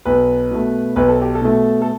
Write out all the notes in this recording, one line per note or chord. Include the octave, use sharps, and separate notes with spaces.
B1 B4
B2 A3
B1 B4
A4
G4
A4
B2 A3
A4